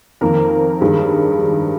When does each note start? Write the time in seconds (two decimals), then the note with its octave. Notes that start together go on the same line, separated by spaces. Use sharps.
0.21 F2 D#3 A#3 A#4
0.81 G2 D#3 G#3